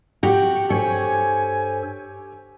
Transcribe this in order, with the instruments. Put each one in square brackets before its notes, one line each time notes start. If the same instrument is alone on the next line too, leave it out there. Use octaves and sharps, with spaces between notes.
[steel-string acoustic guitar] F#4 [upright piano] G4 [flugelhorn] G5
[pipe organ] G2 A4 C5 [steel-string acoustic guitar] C#5 [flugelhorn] G#5